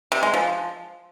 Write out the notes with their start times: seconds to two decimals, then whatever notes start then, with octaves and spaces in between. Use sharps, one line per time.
0.12 C3
0.23 G#3
0.34 F3